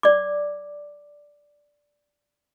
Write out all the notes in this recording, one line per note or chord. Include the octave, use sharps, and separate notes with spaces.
D5 D6